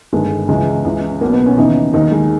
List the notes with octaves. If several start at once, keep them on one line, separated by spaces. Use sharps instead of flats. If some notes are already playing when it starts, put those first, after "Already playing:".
G1 G2 D#3 G#3
C#2 C#3 E3 G#3
C#2 C#3 E3
B1 B2 A#3
B3
C#4
D#2 C#3 E3 D#4
D#2 D#3 D#4
G#3